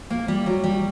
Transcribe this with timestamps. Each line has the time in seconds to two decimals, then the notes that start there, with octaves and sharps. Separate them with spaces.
0.10 A#3
0.28 G3
0.46 F#3
0.64 G3